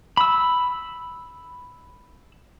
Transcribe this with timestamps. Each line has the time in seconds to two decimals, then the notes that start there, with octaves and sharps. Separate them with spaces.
0.17 B5 E6